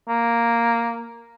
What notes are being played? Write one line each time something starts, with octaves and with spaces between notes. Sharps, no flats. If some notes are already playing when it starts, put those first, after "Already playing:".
A#3